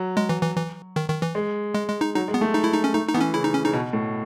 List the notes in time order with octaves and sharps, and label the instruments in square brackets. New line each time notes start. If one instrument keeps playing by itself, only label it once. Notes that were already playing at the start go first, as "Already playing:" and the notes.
Already playing: [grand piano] F#3
[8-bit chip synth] G#3
E3
E3
E3
D#3
D#3
E3
[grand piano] G#3
[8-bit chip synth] G#3
G#3
D#4
[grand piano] F#3 [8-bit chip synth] D#4
[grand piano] G#3
[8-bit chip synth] B3
[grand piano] A3
[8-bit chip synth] D#4
E4
D#4
C#4
[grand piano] A3 [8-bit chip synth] D#4
[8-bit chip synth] D#4
[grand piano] E3 [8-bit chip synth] B3
[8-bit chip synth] C#4
[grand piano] C#3 [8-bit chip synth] E4
[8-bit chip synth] D#4
C#4
[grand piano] C#3 [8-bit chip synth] D#4
[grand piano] B2
A2